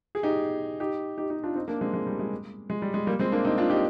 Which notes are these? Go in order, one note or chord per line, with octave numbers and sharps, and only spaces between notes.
G#4
D#4 G4
D#4 G4
D#4 G4
D#4 G4
D4 F4
C4 D#4
A#3 D4
G#3 C4
G#3
G3
G#3
G#3
G3
G#3
G3 A#3
G#3 C4
A#3 D4
C4 D#4
D4 F4
D#4 G4